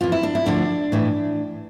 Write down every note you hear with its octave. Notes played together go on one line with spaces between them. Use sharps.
F2 E3 F4
E4
D4
E4
D2 D3 F3 D4
A2 E3